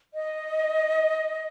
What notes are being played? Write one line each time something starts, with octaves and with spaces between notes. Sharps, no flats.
D#5